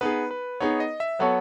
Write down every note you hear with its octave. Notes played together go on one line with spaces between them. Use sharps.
B3 D#4 G#4 B4
B4
B3 D#4 G#4 C#5
D#5
E5
F#3 B3 F#4 A4 C#5